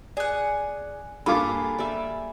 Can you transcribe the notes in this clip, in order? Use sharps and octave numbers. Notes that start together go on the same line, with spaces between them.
G#4 D5 F#5
G2 A#3 F4 G#4 A4 B5 D6
G3 D5 E5